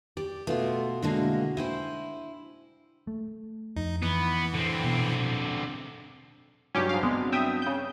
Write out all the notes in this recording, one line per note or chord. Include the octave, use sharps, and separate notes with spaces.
G4 D5
B2 A3 F4 C6
D3 G#3 A#3 D4 E4 F#4
E4 C5 G5 G#5
A3
F2 D#4
E3 B3
D3 C4
B2 B3
G2 F#3 C#4 G4
G#2 F5
G#3 B3 C4
E5 G5 D#6
C#3 G6